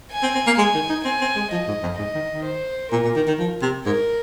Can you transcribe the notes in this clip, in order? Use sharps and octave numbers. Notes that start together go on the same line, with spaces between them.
G#5
C4
C4
A#3
G#3 G#5
D#3
D#4
C4 G#5
C4
G#3
F3 D#5
G#2
F2
G#2 D#5
D#3
D#3
C5
A#2 A#4
A#2
D#3
D#3
F3
C3
G#2 A#4